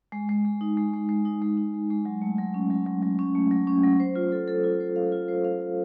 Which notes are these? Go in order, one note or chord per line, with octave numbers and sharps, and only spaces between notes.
G#3
G#3
G#3
D#4
G#3
G#3
G#3
D#4
G#3
D#4
G#3
G#3
F#3
A3
F#3
C#4
F#3
F#3
F#3
C#4
A3
F#3
C#4
F#3
C5
F4
A4
A4
F4
C5
F5
F4
C5
F5
F5